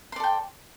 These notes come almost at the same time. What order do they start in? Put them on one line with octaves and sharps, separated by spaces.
C6 D5 A4 G5